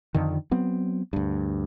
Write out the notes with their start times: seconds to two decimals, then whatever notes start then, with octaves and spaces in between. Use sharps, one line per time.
0.15 F2 D3 D#3
0.51 F#3 B3 C4
1.13 D2 G2